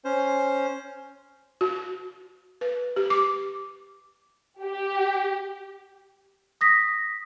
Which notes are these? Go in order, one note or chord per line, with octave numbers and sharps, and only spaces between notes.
C#4 C5
F#4
B4
G4
D6
G4
D#6 A#6 B6